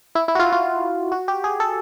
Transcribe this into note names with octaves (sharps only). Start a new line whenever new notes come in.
E4
E4
F#4
F4
F4
F#4
G4
G#4
A4